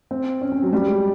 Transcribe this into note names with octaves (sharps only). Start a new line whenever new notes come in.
C4
C#4
C4
F#3
G3
G#3